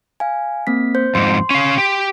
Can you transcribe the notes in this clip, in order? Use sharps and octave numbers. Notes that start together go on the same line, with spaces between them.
F5 G#5
A#3 C4 B6
C5 G6
F2 G#2 C6
C#4 F5
G4